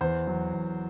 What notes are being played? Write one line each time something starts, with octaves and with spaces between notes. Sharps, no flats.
E2 C5
F#3
E2